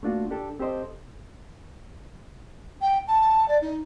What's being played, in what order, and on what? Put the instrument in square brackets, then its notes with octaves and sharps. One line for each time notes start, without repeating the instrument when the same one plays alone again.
[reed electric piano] A3 A#3 D4 F4 F#4
D4 G4 A4
C4 G4 A4 C5 D#5
[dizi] G5
A5
D5
D#4